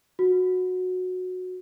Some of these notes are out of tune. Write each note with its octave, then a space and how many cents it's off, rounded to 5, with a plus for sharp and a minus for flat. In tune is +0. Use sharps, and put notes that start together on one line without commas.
F#4 -15